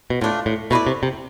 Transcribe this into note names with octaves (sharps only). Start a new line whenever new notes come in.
B2
A2 A3 D4 F4
A2
B2 A3 E4 B4 D5
C3
C3